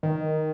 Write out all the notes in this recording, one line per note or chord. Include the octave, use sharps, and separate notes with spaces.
D#3